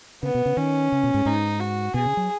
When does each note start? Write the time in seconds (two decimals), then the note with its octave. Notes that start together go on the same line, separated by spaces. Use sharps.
0.23 C#3 B3
0.35 B2
0.46 C#3
0.57 D#3 C#4
0.92 C#3
1.04 B2
1.14 G#2
1.26 G#2 D#4
1.60 F#4
1.94 B2 G#4
2.06 C#3
2.17 F#3